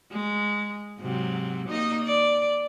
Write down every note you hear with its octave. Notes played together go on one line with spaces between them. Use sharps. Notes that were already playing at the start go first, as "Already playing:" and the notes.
G#3
G#2 C3 F#3
A#3 D#4 D#5
D5